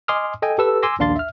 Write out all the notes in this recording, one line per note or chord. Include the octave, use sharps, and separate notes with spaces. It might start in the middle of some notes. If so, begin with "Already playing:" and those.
D#5 G#5 C6 D6 D#6 F6
A4 D#5 G5 G#5
G4 A4 B4 E6
G#5 C6 D6 E6 A#6
A#1 D#2 D4 F5 C6 A6
E5 F6